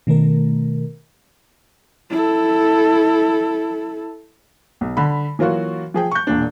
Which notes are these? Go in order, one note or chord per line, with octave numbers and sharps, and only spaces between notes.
B2 D#3 A3 A#4
E4 A4
B1
D3 B5
E3 F#3 A#3 F4 F#4
F3 G#4 G5
C#6 G6
E1 A#2 D4